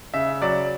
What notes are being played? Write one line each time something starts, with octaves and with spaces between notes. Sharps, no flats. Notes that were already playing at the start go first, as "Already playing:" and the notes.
C#3 E5
F#3 D5